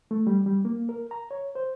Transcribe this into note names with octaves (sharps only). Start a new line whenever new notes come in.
A3
G3
G3
A#3
A#4
A#5
C#5
C5